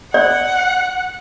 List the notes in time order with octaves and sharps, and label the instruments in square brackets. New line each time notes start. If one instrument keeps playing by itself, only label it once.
[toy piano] D5 [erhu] F#5